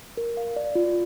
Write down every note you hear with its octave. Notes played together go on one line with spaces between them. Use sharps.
A#4
F5
D5
F4